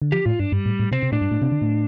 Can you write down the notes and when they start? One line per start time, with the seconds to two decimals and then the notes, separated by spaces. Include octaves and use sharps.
0.02 D3
0.12 F3 G4
0.25 A2 F4
0.39 G2 D4
0.52 G2 G3
0.66 A2
0.80 A2
0.92 C3 C4
1.03 C3
1.12 A2 D4
1.21 G2
1.31 A2
1.42 C3
1.52 D3
1.62 A2